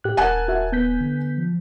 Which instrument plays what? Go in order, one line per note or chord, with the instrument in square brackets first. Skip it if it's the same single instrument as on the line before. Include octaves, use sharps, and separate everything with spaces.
[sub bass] A2 [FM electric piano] G4 F#6
[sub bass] D#1 [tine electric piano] A#4 A5 [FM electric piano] F#5 [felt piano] G#5 F#6
[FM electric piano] F#4 E5
B3 G6 B6
[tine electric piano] D3
[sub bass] F3